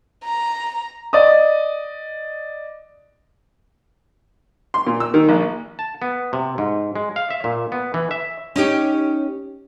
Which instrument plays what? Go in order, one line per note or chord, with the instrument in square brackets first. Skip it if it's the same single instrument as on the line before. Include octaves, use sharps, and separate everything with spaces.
[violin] A#5
[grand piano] D5 D#5 D#6
[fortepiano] C6
A#2
E6
D#3
A#1
[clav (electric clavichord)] A5
B3
C3
G#2
G#3
F5
E5
A#2
B3
E3
E5
[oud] C#4 D#4 G4